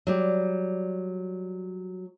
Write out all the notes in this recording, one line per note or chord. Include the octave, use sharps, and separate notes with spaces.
F#3 G3 D5